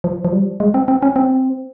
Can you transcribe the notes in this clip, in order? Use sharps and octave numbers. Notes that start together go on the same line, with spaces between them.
F3
F3
G3
G#3
C4
C4
C#4
C4